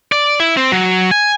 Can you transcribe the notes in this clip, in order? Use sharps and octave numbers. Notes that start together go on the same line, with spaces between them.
D5
E4
C4
F#3
G#5